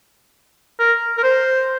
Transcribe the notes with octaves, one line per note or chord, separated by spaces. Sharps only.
A#4
A#4
C5